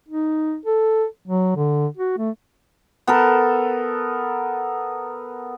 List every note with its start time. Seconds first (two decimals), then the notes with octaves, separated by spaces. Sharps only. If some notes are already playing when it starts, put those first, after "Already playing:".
0.09 D#4
0.66 A4
1.28 F#3
1.56 D3
1.97 F#4
2.18 A3
3.07 B3 A4 A#4